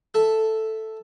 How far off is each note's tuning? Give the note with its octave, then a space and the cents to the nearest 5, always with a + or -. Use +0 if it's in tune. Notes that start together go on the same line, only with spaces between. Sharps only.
A4 +0 E5 +0